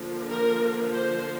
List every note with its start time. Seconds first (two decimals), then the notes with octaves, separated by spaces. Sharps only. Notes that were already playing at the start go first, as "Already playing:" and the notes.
Already playing: D3 F3 A#3
0.29 A#4
0.93 C5